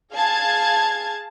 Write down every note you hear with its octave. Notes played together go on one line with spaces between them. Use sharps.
G#4 F5 A5 G#6